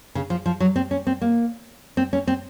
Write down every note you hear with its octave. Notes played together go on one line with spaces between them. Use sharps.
C#3
F3
F3
F#3
C4
C#4
C4
A#3
C4
C#4
C4